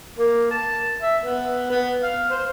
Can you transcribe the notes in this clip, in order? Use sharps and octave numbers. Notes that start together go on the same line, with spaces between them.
A#3
A5
E5
B3
B3
F5
C5